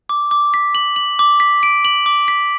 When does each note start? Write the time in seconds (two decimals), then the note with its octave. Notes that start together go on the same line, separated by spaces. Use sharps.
0.09 D6
0.31 D6
0.54 B6
0.75 F#7
0.96 F#7
1.19 D6
1.40 B6
1.63 D7
1.85 F#7
2.06 D6
2.28 B6